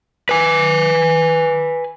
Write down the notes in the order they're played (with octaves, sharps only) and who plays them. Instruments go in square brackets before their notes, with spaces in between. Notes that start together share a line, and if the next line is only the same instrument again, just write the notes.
[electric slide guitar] B4 G#5